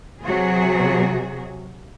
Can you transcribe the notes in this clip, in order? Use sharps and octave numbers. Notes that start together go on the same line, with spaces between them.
C3 F#3 F#4 G#4